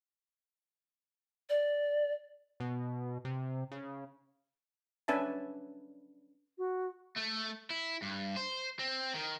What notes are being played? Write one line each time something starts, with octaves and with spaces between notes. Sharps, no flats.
D5
B2
C3
C#3
C#4 D4 B4 E5 G#5 A5
F#4
A3
E4
G2
C5
C4
D#3